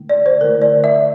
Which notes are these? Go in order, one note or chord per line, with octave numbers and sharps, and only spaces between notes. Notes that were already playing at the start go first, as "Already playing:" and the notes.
Already playing: D3 A3 E4
D5
C5
D3 A3 E4 A#4
D5
E5